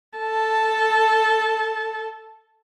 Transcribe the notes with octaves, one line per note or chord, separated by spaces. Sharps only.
A4 A5